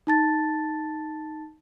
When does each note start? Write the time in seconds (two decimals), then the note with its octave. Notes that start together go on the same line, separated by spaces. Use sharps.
0.07 D#4 A5 A6